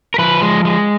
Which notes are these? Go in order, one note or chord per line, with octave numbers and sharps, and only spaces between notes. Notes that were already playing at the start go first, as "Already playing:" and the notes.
A#4
F3 B4
G#3
G#3